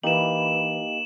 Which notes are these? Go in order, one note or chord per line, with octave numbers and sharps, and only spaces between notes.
E3 A#3 D#4 G4 E7 F#7